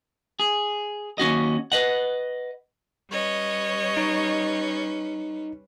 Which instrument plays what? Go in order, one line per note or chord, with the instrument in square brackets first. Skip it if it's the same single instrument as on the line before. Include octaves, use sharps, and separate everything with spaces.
[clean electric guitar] G#4
D#2 C#4 F#4 D#5
B4 D#5 F#5
[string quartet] G3 C#4 B4 [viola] C#5 D#5
[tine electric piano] D#4